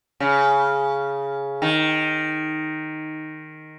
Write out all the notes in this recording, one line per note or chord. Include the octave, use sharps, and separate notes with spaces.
C#3
D#3